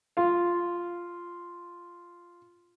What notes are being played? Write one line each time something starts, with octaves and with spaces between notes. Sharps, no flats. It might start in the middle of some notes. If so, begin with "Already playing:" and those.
F4 F5